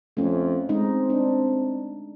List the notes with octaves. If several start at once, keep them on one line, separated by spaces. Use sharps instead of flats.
F2 A3 C#4
G#3 C4 D#4
D4